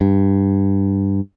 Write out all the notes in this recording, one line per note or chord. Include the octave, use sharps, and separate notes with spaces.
G2